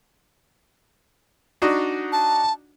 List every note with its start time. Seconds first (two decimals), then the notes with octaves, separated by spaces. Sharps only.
1.62 D4 D#4 F#4
2.12 A5